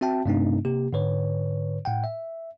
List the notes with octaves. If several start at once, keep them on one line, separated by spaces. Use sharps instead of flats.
C4 F#4 E5 G5 A5
G2 C3 A3 C4 D4 D#4
C3 A#3 G4
G#2 D3 B4 C#5
A2 F#5 G5
E5